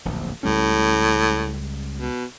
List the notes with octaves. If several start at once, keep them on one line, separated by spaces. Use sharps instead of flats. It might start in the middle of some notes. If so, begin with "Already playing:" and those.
D1 A#1 E2
C#2 A2 G3 C#4
B2